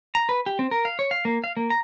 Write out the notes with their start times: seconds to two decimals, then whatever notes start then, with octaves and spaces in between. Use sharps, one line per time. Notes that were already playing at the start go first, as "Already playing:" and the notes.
0.15 A#5
0.29 B4
0.46 G4
0.59 C4
0.71 A#4
0.85 F5
0.99 C#5
1.11 F5
1.25 A#3
1.44 F5
1.57 A#3
1.70 A#5